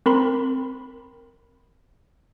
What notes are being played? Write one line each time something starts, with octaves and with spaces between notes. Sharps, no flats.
C4 A#4 B5 C6